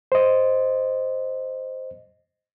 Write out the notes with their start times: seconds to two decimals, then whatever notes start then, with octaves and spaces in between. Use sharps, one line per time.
0.12 C5 D#5